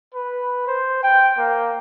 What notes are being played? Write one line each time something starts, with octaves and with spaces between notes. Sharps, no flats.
B4
C5
G5
A#3